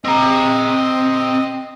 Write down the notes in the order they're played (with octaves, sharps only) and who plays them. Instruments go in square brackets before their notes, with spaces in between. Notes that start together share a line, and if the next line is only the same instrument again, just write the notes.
[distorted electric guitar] C4 A#5 [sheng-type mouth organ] D#5